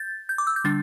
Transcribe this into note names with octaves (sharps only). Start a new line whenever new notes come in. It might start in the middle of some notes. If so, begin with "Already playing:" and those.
Already playing: G6 A6
G6
D6
E6
G6
D3 G3 D4 A6